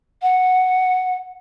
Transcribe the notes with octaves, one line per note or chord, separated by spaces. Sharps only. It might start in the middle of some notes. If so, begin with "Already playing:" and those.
F#5